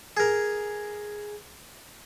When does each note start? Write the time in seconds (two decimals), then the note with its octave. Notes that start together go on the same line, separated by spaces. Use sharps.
0.17 G#4 A#4